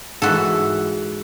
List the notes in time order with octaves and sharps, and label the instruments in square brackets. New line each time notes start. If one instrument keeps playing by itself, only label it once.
[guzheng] G#2 E3 F#4 A4